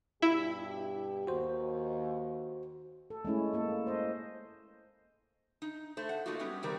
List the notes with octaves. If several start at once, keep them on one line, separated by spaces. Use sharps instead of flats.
G2 B2 E4 G4
D#2 F#4 C5
A4
G#3 A3 C#4 E4
A#3 A4
C5 D#5
D#4
A3 C5
F#5
F#3 A3 A#3 D#4 F4 F#4
F#3 G3 B3 C#4
C3 D#3 G3 C4 A#4